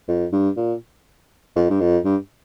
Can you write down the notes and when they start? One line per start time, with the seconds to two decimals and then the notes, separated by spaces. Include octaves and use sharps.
0.08 F2
0.32 G2
0.56 A#2
1.56 F2
1.70 G2
1.80 F2
2.05 G2